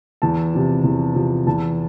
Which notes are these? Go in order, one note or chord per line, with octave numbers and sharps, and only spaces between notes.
E2 A5
C3 F3
E2
C3 F3
E2 A5